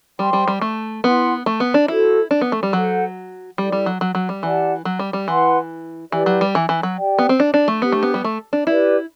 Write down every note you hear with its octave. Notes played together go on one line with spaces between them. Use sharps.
G3 C5 G5 C6
G3
G3
A3
B3 E4 B4 F#5 C6
A3
B3
D4
E4 F#4 A4 C5
D4
B3
A3
G3
F#3 A4 C5 F#5
G3 E4 A4 D5
G3
F#3
F#3
F#3
G3
E3 G4 D5 F#5 A5
F#3
G3
G3
E3 E4 B4 F#5 C6
E3 E4 G4 B4 D5
F#3
G3
E3
E3
F#3
G4 D5 G5
B3
C4
D4
D4
A3
B3 D4 G4 C5
A3
B3
G3
A3
D4
E4 G4 B4 D5